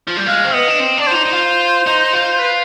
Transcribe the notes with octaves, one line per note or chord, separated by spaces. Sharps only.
F3
G3
G#3 F5
C4
B3 D#5
D4
C4
D4 D5
F4 C5
D#4
D#4
F4
D#4
F4
B4